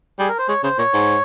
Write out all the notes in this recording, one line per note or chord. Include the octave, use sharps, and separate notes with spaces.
G3 G#4
A#4
C5
G#3 C#5
C#3 C5
A#2 C#5
G#2